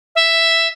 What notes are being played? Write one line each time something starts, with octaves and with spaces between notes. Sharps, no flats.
E5